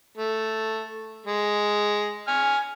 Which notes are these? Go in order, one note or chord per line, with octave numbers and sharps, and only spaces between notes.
A3
G#3
G#5 F6